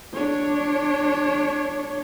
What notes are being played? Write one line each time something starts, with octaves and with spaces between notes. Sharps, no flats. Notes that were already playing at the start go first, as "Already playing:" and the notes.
D4 C#5